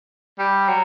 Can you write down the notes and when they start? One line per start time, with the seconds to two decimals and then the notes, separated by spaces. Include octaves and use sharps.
0.39 G3
0.69 F#3